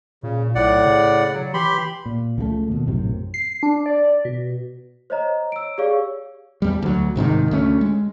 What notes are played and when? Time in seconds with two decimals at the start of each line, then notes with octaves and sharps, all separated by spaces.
0.23 A#2 C#3
0.55 B1 A2 D5 F#5
0.85 C#3
1.34 F#3
1.54 E3 G4 B5 C6
2.06 A#2
2.38 C#2 F3 F#3 A3
2.67 D#2 B2
2.87 A#1 F#2 A2 C3
3.34 C7
3.63 D4
3.86 D5
4.25 B2
5.10 C5 C#5 D#5 A#5
5.52 E6 D7
5.78 G4 G#4 C#5 D5 F5 C#6
6.62 E2 G3
6.82 D2 F#3
7.16 C2 G#2 C3 D#3
7.51 D2 A3 C#4
7.81 G#3